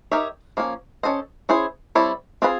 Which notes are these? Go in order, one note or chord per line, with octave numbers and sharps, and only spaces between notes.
D#4 G4 A#4 C#5 E5
F3 A#3 C#4
C#4 F4 A4 C5 D#5
C#4 E4 G#4 C5
G3 C4 E4 A4 C#5
C4 F4 G#4 B4